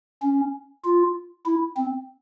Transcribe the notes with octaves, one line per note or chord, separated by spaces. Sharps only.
C#4
F4
E4
C4